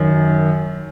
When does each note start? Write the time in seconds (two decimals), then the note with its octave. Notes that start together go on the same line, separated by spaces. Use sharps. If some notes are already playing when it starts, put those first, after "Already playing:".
Already playing: F#2 D#3